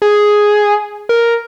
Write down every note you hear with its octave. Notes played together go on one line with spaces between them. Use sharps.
G#4
A#4